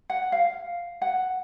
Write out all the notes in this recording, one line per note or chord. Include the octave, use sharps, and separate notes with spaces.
F#5
F5
F#5